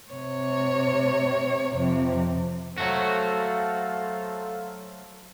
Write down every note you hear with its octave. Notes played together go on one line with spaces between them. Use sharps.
C3 C#5
F2 C3
F#3 A3 F#4 A4 C5 F5